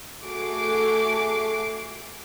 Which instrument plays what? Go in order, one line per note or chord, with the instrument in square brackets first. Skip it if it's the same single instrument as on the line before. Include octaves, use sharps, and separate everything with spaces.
[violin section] A3 F#4 G#4 D6 C7